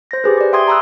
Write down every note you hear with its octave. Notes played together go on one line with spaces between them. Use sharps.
C5 A#6
G4 G#4 B4
G4 D5
E5 G5 C6 D#6 G#6
A#5 B5 D#6 E6 F#6